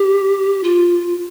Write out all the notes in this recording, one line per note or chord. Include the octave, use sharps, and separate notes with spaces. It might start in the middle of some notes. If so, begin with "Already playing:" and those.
Already playing: G4
F4